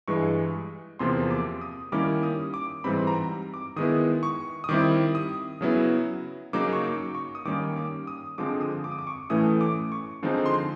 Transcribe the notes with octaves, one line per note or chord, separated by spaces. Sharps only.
G2 E3 G#3 C#6
E2 C3 F3 A#3 C6
D6
D#6
D#3 G3 A#3 C#4 E4 D6
D#6
D6
G#2 E3 G3 C4 B5
A#5
D6
D#3 G#3 B3 E4 D#6
C#6
D#6
D#3 G3 C4 E4 D6
D#6
C#3 F#3 B3 E4
C#3 F#3 A#3 D#4 D6
C#6
D6
C#6
D#6
D#3 G3 A#3 C#4 D6
D6
D#6
D3 F3 G#3 C4 D6
D#6
D6
D#6
D6
C#6
A2 E3 A3 C#4 D#6
D6
C#6
D3 F3 G#3 C4 D#4
C6